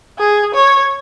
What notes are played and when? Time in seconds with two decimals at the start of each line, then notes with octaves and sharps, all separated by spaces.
0.19 G#4
0.54 C#5